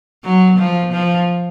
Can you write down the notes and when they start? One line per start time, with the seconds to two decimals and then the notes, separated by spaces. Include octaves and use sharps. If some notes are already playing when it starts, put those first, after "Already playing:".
0.24 F#3
0.59 F3
0.93 F3